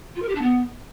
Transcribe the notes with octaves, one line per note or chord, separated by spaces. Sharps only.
F4
A#4
G4
D4
B3